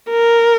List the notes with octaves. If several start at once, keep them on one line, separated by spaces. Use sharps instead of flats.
A#4